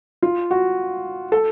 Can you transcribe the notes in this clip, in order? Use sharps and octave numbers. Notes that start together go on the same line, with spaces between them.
F4
F#4
A4